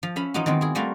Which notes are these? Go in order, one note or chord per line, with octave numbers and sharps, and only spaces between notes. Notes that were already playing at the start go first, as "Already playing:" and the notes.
F3
C#4 E5 F5 B5
E3 F3 D#4 F4 F#4
D#3 G#3 B3 C4 B4
E4 G#4
G3 A3 A#3 F4 F#4